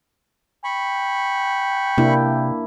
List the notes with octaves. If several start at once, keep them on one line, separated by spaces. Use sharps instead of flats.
G5 B5 C#6
C3 A#3 D4 E4